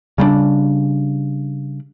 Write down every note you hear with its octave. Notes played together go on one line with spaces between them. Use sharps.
C#3 G3 A3 D4